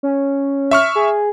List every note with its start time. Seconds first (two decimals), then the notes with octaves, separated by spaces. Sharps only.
0.03 C#4
0.71 E5 C#6 F6
0.95 G#4